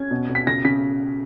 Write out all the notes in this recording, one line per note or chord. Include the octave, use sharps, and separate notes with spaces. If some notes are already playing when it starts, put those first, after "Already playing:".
Already playing: C#4 G#6
B2
B2
B6
C#3 A#6
C#3 B6